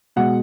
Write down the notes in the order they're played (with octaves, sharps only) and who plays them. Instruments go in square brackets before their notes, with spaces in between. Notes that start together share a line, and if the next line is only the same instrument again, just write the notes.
[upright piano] B2 G#3 F#5